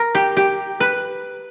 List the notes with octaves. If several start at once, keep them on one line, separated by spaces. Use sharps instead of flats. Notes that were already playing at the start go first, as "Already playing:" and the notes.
Already playing: A#4
G4
G4
B4